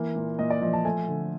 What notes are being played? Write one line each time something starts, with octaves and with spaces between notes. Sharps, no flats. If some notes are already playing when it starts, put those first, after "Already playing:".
Already playing: E3 A#3
A#2
A#2 D#5
D5
F3 D#5
A5
A3 G#5
D3